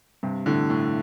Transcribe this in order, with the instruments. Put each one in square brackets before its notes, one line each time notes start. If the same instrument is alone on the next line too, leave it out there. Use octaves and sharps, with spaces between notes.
[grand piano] G2 C3
A2 D3
A2